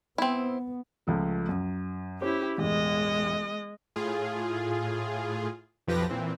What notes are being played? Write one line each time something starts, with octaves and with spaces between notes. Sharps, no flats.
B3 C4 E4
C#2 F3 A3
F#2
C#4 E4 G4 C5 C#5
E1 A1 G#3 D#5
A2 F4 G#4
B1 F2 F3 G4 B4 A#6
A#2 E3 C4